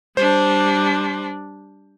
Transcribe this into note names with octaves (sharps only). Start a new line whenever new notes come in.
G3 D4 C5